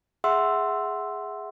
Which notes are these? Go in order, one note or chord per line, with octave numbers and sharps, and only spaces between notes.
G#4 E5 F#5 C6 E6